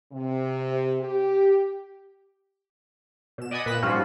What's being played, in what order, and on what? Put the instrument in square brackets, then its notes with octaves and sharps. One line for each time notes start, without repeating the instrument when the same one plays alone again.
[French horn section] C3
G4
[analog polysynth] B2 E7
D5 D#5 F#5 G#5 B5 D#6
A#2 B4 B5 F#6 E7
G#2 F3 G3 C#4 F4 F#4